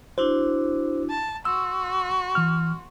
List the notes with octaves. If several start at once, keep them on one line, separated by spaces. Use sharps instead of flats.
D4 E4 F#4 C5
A5
F#4 C6 E6
E3 F6